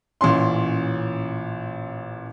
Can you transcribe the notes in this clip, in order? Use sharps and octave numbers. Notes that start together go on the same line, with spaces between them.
A1 A#2 C#4 C6